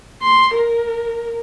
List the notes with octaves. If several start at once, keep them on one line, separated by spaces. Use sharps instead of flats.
C6
A#4